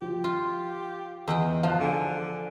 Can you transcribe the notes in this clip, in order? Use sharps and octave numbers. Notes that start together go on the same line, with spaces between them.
F3 G4
F4
E2 D#5 F#5 G5
F3 F5 A5 F#6
D3 G#5 F6